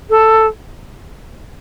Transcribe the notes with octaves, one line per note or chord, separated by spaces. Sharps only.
A4